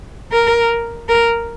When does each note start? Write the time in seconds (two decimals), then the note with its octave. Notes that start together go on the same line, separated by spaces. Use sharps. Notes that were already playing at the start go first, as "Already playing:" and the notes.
0.32 A#4
1.08 A#4